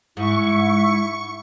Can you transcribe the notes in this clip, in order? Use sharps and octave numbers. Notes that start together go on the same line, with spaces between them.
G#2 E4 C#6